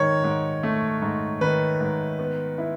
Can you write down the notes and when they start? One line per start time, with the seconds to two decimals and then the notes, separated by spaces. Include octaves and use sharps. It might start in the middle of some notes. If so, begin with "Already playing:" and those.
Already playing: G#2 D#3 C#5
0.24 G#2
0.63 A3
1.02 G#2
1.41 D#3 B4
1.81 G#2
2.19 B3
2.58 E4